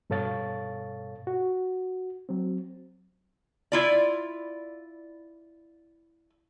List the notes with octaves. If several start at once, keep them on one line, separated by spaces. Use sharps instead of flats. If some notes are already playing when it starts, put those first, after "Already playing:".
G2 B2 A4 C#5 F5 A6
F#4
F#3 C4
E4 F4 D5